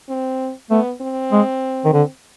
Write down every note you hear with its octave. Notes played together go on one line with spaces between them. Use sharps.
C4
A3 B3
C4
G#3
D#3
D3